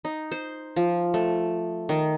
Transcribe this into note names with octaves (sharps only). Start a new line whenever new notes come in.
D#4
C5
F3
A3
D#3